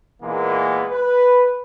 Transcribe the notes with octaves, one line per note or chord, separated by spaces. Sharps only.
A#2 E3 G#3 A#3 B3
B4